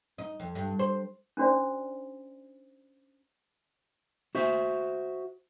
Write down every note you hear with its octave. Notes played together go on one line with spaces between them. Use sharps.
D#4
F2
G2
C5
C#4 D4 F#4 C5 D5
F#4 C5 E5